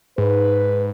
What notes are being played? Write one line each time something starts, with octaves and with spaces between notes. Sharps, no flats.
G#2 B4